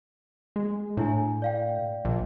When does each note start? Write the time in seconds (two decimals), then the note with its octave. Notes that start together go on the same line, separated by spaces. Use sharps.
0.56 G#3
0.97 A2 D4 E4 G#5
1.42 D5 F5 G5
2.05 A#1